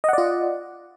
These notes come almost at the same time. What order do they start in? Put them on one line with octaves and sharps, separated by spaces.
D#5 F#5 D5 F4